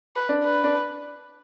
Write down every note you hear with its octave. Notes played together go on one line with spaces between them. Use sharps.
B4
D4
B4
D4